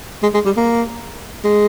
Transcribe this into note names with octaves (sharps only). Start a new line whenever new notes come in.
G#3
G#3
G3
A#3
G#3